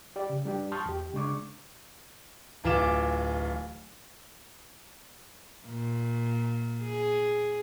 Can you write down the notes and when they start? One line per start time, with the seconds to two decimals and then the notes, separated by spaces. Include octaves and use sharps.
0.16 G4 D5
0.30 C#3
0.45 G3 D4 G4
0.72 A5 C6 C#6 D#6 F6 G6
0.86 E2 G4
1.13 C#3 G#3 D4 C#6 D6
2.64 D1 E3 F4 D6 E7
5.66 A#2
6.84 G#4